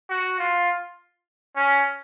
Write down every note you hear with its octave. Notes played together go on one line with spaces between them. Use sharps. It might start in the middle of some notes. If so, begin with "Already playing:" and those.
F#4
F4
C#4